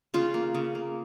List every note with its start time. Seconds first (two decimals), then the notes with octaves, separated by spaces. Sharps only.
0.14 C#3 F4
0.34 A#3
0.54 C#3
0.75 A#3